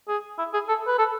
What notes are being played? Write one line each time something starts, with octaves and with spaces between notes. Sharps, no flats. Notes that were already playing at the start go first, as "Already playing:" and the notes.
G#4
E4
G#4
A4
B4
A4